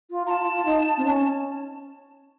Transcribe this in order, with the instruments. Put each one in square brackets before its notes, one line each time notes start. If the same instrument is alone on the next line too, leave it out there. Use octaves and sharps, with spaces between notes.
[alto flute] F4
[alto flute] F4 [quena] A#5
[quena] A5
[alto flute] F4
F4
D#4
C4
C#4